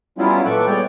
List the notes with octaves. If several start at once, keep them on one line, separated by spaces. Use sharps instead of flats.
F#3 G3 B3 C#4 E4 F4
A#2 E3 A4 C#6 D6 F#6
G3 G#3 B3 C#5 D5 G5